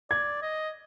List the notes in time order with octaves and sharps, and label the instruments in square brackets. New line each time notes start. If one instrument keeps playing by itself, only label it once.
[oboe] D5 [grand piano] G#6
[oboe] D#5